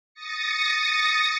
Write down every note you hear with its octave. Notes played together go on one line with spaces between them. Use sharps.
D#6 A6 A#6 C#7